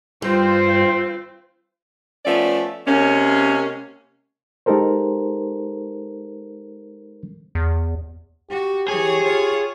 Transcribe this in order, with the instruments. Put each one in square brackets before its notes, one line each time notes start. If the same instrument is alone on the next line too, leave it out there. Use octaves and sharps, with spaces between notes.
[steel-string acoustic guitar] G2 [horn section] C4 [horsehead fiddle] F4 C5
[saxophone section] F3 A3 B3 C#4 D5
C3 G#3 A#3 C#4
[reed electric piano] G#3 D#4 G4 A4 A#4 C5
[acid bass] E2
[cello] F#4 [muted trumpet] G4
[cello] E3 C#5 [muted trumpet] G4 [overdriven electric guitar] G#4
[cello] F4 C#5